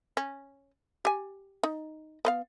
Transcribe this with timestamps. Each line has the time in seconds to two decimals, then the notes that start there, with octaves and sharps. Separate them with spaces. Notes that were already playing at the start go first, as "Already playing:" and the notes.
0.17 C#4
1.05 G4 G#5
1.63 D#4
2.25 B3 B4 F5